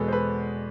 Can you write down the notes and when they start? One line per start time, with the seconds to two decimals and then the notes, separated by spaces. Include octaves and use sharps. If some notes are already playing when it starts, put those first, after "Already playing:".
Already playing: E2 B2 G#3 A4 B4
0.08 C5
0.13 A4 B4